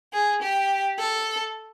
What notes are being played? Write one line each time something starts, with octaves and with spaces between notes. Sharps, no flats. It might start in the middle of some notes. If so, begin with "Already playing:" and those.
G#4
G4
A4